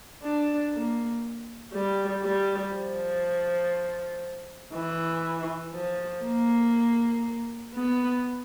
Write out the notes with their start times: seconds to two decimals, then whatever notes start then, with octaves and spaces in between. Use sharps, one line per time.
0.23 D4
0.73 A#3
1.73 G3
2.23 G3
2.74 F3
4.74 E3
5.74 F3
6.24 A#3
7.74 B3